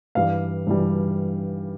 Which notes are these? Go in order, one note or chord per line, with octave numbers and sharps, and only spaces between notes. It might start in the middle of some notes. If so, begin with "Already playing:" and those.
G2 E3 G3 F5
G2 E3 G3